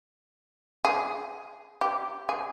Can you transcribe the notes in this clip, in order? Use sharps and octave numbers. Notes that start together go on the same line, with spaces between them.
G#4
G4
G#4